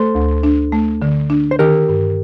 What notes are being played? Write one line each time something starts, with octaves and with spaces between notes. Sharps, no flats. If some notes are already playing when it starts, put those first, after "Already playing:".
Already playing: A3 A4 C5
D2
D4
A3
D3
D4
C5
D#3 G4 A#4
G2